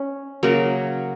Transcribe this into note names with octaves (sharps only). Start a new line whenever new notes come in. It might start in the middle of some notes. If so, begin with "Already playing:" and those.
Already playing: C#4
C#3 F#3 A#3